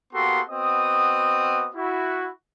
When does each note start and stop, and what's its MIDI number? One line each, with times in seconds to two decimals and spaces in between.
0.13 0.41 58
0.13 0.41 59
0.13 0.41 66
0.13 0.41 67
0.13 0.41 69
0.13 0.41 84
0.49 1.69 59
0.49 1.69 60
0.49 1.69 66
0.49 1.69 75
0.49 1.69 87
1.74 2.28 64
1.74 2.28 66